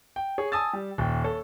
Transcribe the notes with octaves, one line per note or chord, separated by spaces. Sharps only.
G5
G#4 C#5
G#5 A5 D#6 E6 A6
G3
D#1 G5
A4 C#5